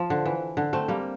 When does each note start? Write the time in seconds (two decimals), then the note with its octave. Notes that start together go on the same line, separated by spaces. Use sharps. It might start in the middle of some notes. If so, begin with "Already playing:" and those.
Already playing: F3
0.10 D3
0.25 E3
0.57 D3
0.73 A3 C4
0.88 G3 A#3